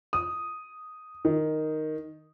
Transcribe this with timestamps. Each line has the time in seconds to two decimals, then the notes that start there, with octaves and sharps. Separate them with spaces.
0.13 D#6
1.25 D#3